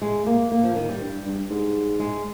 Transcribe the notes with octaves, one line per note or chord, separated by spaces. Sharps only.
G#3
A#3
A#3
F3
D#3
G3
G2
G2
G#2
G#3